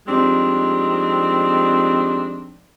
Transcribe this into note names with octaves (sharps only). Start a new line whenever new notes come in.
F2 G3 G#3 C4 D4 D#4